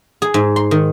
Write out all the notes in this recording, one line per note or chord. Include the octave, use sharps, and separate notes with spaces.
G#4
G#2
C6
D#3